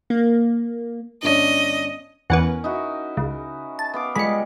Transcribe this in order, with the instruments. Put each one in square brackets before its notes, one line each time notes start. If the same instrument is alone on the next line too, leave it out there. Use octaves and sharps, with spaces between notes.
[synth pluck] A#3
[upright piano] G1 C#4 D4 [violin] D#5
[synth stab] E2 E3 B3 [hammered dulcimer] C#4 A#4 [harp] F#5
[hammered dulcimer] D#4 E4 F#4
[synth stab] C#2
A5
[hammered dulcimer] B3 F5 D6
[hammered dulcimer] G3 F4 [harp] G#3 [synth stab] B5 C#7